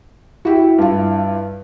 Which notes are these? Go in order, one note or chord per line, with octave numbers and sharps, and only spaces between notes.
E4 F#4 G4
G2 F4